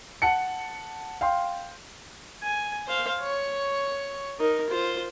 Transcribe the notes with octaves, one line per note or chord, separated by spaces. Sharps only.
F#5 A5 C#7
F5 G5 C6
G#5
C5 F5
C#5 C#6
D#4 A#4
F4 C5